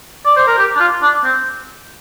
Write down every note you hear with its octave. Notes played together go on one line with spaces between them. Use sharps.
D5
C5
A#4
G4
D4
F4
D4
C4